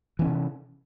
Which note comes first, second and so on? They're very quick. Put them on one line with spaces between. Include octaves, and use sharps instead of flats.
E3 C4 C#4 C3